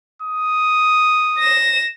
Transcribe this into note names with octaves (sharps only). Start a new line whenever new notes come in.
D#6
A#6 E7